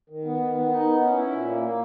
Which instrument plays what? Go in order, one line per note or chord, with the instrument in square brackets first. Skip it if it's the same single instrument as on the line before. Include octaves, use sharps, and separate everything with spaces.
[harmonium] D#3
B3
D#3
B3
D#4
B3
C#4
E4
A#2
A#3
A#3